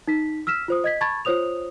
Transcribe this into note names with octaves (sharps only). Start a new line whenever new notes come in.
D#4 B6
E6 F6 B6 E7
F4 C5 D#6
D#5 G#6 B6
A5 B5 C#6 G#6 A6
F4 C5 C#5 D#6 F7